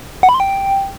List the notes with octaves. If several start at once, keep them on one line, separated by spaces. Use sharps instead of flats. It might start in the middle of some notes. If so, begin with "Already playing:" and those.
F#5
B5
C6
G5